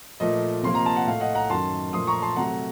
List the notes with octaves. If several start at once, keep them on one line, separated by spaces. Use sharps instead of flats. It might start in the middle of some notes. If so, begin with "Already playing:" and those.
A#2 F3 A3 D#5
C3 F3 A#3 C6
A#5
A5
F#5
A2 A3 F5
D#5 F#5
F#5 A#5
F#2 D#3 F#3 A5 C6
A#2 F3 A3 C6 D#6
A#5 C#6
A5 C6
C3 F#3 A3 F#5 A#5